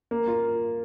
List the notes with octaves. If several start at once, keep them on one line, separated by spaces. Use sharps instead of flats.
A#3
F4